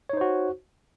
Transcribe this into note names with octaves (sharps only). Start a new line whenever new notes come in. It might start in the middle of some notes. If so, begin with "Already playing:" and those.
D#4 F#4 C5 C#5